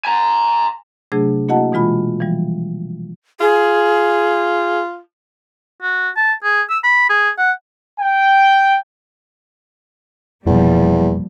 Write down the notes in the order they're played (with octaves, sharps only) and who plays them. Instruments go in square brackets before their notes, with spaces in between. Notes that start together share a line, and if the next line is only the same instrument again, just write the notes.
[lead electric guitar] G#5 A#5
[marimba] C3 F#3 A3 D4 G#4 G#6
A#3 E4 F#4 D#5 F#5 A5
B2 E3 G#3 F4 B5
E3 F3 G3
[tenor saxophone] F4 [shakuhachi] G#4
[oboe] F#4
A5
G#4
E6
B5
G#4
F#5
[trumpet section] G5
[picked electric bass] F1 B2 [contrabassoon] E2 [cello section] F3 G3 A#3